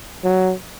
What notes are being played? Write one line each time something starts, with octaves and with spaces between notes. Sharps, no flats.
F#3